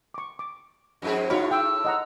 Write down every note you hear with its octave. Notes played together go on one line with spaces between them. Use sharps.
C#6 D6
D6
F2 G#2 G#4
A2 D#4 E4 F#4 C#5 B5
G5 E6
D#5 F#5 A#5